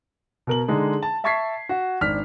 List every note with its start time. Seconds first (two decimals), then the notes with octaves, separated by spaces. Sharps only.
0.47 B2 A#4 F#7
0.68 D3 G#3 D#4
1.03 A5
1.24 E5 A5 C#6 G#6 B6 C7
1.69 F#4
2.01 G#1 D4 F6 B6